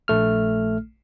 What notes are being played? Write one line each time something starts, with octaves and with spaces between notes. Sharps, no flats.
A#1 A3 F6